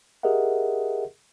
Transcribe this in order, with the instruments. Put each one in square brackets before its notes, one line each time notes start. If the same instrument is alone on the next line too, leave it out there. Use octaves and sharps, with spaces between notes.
[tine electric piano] G4 G#4 A#4 D#5 E5 F#5